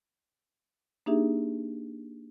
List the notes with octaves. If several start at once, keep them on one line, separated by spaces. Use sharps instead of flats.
A#3 D4 D#4 G4 G#4 E5